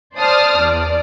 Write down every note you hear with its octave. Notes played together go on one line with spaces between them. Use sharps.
C5 D5 A5 D#6 F6
E2 D5